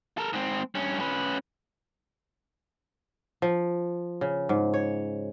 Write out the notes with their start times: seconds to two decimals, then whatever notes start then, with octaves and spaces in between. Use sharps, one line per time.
0.18 A4 A#4
0.33 G#2 C4
0.75 G2 C#4
1.00 C#4 B4
3.42 F3
4.21 C#3
4.49 G#2
4.74 C#5